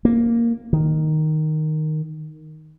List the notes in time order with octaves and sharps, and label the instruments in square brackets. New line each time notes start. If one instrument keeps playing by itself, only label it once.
[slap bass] A#3
D#3